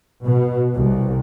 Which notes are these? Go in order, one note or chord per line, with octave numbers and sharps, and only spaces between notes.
B2
C2